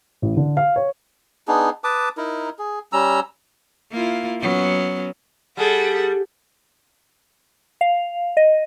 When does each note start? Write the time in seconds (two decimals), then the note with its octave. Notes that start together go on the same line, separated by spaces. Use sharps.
0.22 A1
0.37 D3
0.57 F5
0.76 C#5
1.48 B3 D4 D#4 G#4
1.84 B4 A5 D6 D#6
2.17 D#4 E4 A#4
2.59 G#4
2.93 G3 C#4 A#5 E6
3.91 A#3 E4 F4
4.41 F#3 B3 C#4
5.57 G3 G#4 A4 F#5
7.81 F5
8.37 D#5